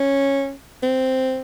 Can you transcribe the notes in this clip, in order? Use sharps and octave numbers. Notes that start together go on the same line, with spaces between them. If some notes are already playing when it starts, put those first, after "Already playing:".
Already playing: C#4
C4